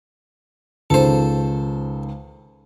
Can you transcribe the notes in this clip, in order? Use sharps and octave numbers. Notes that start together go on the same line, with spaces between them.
C#2 D#3 A4 C5